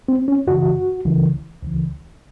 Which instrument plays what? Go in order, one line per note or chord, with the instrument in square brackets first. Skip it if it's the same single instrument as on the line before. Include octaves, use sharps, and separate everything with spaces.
[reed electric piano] C4
C#4
F#2 C#3 E3 F#4
C#2 C#3 E3
C#2 C#3 E3